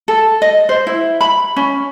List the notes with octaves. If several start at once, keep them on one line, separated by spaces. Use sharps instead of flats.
A4
D#5
C5
E4
B5
C#4